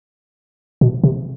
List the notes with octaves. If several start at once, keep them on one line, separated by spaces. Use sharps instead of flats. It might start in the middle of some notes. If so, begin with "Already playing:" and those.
B2
C3